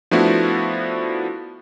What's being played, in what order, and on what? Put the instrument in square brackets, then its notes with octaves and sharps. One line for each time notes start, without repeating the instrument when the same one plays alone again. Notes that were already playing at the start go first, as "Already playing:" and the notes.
[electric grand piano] F3 A3 B3 D4 E4 F#4